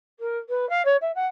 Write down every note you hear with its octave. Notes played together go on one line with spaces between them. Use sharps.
A#4
B4
F5
C#5
E5
F#5